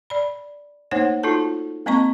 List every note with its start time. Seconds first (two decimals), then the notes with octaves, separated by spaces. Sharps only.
0.10 D5 B5
0.91 A3 A#3 D#4 C5 C#5 F#5
1.23 D#4 F4 F#4 A4 A5
1.86 G#3 A#3 C4 D#5 A#5 C#6